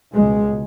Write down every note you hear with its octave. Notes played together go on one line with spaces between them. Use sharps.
C#2 B2 G#3